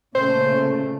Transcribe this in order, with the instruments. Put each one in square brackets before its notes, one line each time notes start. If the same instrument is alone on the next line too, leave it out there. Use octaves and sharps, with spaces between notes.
[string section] A#2 C#3 A3 [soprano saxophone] C5